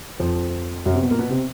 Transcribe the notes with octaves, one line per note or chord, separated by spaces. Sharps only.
F2 F3
F#2 F#3
C3 C4
B2 B3
A#2 A#3
B2 B3
C3 C4